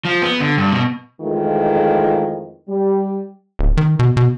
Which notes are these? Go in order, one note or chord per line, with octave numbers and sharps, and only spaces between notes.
F3
B3
D3
G2
B2
F2 D#3 E3 G#3 A3 F4
G3
D1
D#3
B2
B2